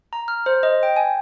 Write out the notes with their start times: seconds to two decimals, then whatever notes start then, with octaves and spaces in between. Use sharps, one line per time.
0.13 A#5
0.28 F6
0.46 C5
0.63 D#5
0.83 G5
0.96 G#5